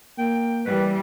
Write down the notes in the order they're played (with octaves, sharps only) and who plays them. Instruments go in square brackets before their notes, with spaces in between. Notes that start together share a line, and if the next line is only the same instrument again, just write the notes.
[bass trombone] A#3 [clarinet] G5
[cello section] E3 G3 [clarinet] B4